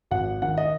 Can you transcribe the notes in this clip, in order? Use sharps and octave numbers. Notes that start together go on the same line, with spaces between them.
G#1 F#5
D#3 F#5
D#5